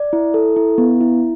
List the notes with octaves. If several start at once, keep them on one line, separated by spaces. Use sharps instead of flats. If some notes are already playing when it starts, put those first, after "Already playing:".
Already playing: D5
E4
A4
E4
B3
E4